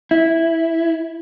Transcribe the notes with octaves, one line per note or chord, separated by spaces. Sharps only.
E4